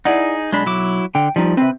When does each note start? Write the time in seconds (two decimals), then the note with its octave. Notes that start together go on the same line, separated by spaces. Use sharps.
0.05 D#4 E4 G#4 D5 F#5
0.52 B1 G#3 D4 B5
0.66 F#3 E4 D6
1.15 D3 G5
1.36 F3 G3 D#4
1.57 C3 C4 B4